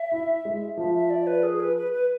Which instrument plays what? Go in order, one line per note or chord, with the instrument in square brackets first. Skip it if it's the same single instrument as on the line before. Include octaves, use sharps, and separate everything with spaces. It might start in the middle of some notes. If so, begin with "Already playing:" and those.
Already playing: [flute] E5
[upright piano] E4
G#3
[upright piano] F3 [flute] E5
[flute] E5
D5
B4
G#4
B4
B4
B4